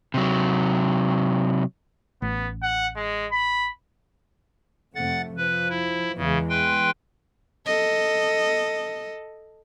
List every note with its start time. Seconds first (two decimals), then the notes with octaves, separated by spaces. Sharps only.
0.14 C3 F#3
2.22 A1 B3
2.63 F#5
2.96 G#3
3.32 B5
4.95 F2 C3 A3 F#5 A6
5.37 F3 B4
5.69 E4
6.17 E2 C#3 E3 G#3
6.49 B4 G5 C6
7.66 A4 D#5